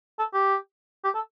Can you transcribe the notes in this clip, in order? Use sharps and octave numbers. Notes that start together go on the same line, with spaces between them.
A4
G4
G4
A4